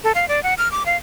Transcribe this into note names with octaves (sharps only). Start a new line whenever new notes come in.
A4
F5
D5
F#5
F6
D6
F5